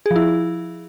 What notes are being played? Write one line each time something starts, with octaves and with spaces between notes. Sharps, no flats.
G#4
F3
E4